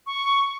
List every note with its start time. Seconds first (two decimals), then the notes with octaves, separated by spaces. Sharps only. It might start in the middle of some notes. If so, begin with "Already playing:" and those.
0.06 C#6